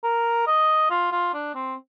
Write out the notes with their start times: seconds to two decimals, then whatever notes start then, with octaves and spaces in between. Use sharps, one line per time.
0.04 A#4
0.47 D#5
0.90 F4
1.12 F4
1.34 D4
1.55 C4